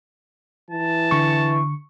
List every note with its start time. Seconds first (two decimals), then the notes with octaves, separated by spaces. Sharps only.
0.70 E3 A5
1.11 D3 C#6